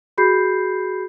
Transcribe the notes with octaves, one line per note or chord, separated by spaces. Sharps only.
F#4 G#4 B5 G6 C7